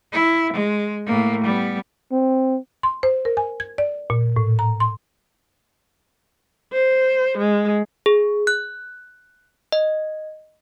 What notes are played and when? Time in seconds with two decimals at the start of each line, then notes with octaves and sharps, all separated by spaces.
0.12 E4
0.53 G#3
1.06 A2 A#3
1.44 G3 B3
2.12 C4
2.83 C6
3.03 C5
3.25 A#4
3.37 G#5
3.60 G#6
3.78 D5
4.10 A#2
4.36 A2
4.59 A#5
4.80 C6
6.72 C5
7.38 G#3
8.06 G#4
8.47 F#6
9.72 D#5